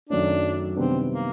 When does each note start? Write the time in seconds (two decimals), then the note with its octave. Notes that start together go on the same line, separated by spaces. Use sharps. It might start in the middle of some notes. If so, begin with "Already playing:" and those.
0.09 F#2 D#3 F#3 A3 C#4 D4
0.76 C3 D#3 G3 B3 C4 D4
1.10 A#3